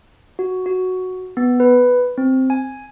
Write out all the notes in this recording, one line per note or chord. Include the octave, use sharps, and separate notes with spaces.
F#4
F#4
B3
B4
C4
G#5